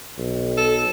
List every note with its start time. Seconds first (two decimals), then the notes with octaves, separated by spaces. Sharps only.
0.18 B1
0.57 A4